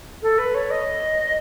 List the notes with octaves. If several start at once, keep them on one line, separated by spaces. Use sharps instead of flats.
A4
B4
C#5
D#5